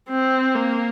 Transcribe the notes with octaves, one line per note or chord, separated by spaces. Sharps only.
C4
A#3